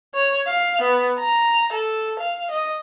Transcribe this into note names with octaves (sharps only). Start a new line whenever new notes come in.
C#5
F5
B3
A#5
A4
F5
D#5